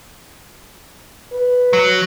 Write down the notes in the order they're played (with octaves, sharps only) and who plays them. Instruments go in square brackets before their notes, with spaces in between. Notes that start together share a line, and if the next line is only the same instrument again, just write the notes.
[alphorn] B4
[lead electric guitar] F#3